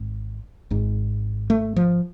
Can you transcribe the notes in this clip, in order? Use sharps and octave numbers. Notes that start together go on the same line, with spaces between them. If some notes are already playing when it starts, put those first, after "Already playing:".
Already playing: G#1
G#1 G#2
A3
F3